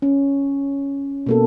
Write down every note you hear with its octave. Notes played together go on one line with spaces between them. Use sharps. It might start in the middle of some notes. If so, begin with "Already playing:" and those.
C#4
B2 A#3 A4